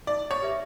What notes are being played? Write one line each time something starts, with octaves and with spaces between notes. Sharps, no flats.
D#4 D5
C#5
G4 B4 E5